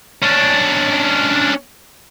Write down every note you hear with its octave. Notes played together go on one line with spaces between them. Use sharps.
C#4 D4